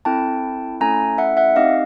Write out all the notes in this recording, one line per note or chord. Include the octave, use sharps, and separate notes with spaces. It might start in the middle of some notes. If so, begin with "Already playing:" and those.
C4 E4 A4 G5 A5
A3 C#4 E4 A4 G#5 A#5
E5 F#5
E5 F#5
C4 D#4 G4 D#5 F5